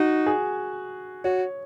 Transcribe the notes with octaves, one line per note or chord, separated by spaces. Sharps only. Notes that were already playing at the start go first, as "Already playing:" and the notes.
Already playing: D#4 F#4
G#4
F#4 C#5